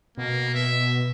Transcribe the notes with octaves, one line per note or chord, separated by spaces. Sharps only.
B2 A#3
E5